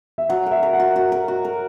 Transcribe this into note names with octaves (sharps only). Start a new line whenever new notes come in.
E5
F#3 F#5
A#4
E5
A#4
F#5
F#4
F#4
A#4
F#4
A#4